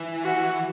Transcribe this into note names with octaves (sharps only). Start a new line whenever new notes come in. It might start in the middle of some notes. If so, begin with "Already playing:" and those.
Already playing: E3
F#4